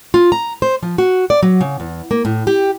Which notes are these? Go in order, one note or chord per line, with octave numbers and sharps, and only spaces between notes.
F4
A#5
C5
F3
F#4
D5
F#3
C#3
E2
A#3
A2
G4